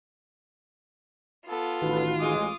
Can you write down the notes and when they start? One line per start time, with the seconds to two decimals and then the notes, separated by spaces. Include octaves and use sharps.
1.48 B3 F4 A4
1.82 A1 D#3 F#4 B4
2.20 A1 G#3 D6 D#6